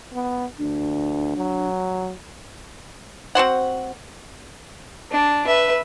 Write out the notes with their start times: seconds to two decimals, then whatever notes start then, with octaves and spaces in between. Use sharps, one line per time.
0.13 B3
0.58 D2 D4
1.37 F#3
3.35 C4 F#4 C5 F#5
5.12 D4
5.47 B4 E5